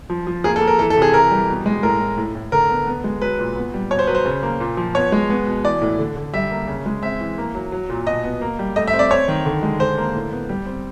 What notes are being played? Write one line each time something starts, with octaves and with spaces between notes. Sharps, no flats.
F3
F3
A#3 G#4
A4
A#3
A#4
E3 A4
A4
C3
G#4
E3 A#4
G3
B2
G#3
A2 A#4
A2
A2
A2
D3 A#4
B3
B3
G#3
F#3 B4
A#2
B3
G3
B2 C#5
C5
F#3 B4
C5
C#3
A#3
A#2
F3
B3 C#5
G#3
B3
B2
E3 D5
A2
D3
D3
G3 E5
A#3
C#3
G#3
C4 E5
E3
A#3
F#3
F#3
A#2
B2 D#5
B3
A#3
G3
A3 D#5
E5
C4
D5
C4 C#5
D#3
D3
G#3
D3 C5
A#3
A2
B3
G3
C4